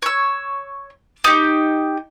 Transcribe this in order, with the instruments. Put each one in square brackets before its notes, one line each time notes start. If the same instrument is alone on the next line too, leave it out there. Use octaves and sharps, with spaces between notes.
[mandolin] C#5 E6
D#4 G4